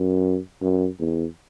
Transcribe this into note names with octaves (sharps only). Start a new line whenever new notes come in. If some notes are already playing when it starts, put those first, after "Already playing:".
Already playing: F#2
F#2
E2